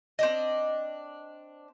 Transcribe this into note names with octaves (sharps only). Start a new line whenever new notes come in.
C4 D4 D#5